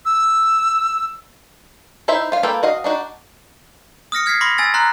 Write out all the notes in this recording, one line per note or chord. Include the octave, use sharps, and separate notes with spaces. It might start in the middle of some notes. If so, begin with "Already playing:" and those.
E6
D#4 E4 C5 E5
F4 F5
A#3 F4 A4 B4 G5
F#4 D#5 F5
D4 D#4 F#4
D#6 F6 A#6 C#7
F6 G#6 B6 C7
B5 C6 D6 A#6 B6
G#5 E6 A6
A#5 C6 F#6